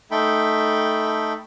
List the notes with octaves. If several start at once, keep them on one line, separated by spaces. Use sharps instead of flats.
A3 D#4 A4 G5 B5